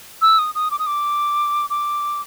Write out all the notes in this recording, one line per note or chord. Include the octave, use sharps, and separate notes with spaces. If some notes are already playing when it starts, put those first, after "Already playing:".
E6
D#6
D#6
D6
D#6
D6
D6